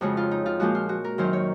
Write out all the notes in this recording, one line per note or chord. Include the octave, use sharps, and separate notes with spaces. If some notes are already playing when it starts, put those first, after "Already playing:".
F2 C#3 G#3 F#4
F4
D#4
F4
A#2 F3 G#3 F#4
F4
F#4
A#4
F#2 D#3 F#3 C5
C#5